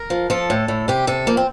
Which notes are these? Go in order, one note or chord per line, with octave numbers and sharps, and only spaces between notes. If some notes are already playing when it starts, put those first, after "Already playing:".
Already playing: A#4
F3
F3 A4
A2
A2
C3 G4
C3 A4
F3 A#3
C4